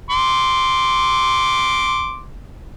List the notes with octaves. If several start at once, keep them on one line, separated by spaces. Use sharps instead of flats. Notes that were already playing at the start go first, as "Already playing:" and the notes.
C6 D6